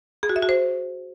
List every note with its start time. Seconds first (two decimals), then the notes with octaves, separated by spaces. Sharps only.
0.23 G#4
0.29 F#4
0.36 E5
0.42 F#4
0.49 C5